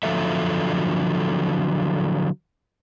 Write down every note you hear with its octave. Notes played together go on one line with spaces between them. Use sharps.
D3 F3 F#3 F4 A4 E5